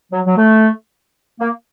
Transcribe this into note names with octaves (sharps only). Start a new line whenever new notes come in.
F#3
F#3
A3
A#3